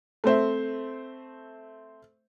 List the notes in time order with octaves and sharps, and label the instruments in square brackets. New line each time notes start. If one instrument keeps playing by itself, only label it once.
[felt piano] A3 C4 C5 E5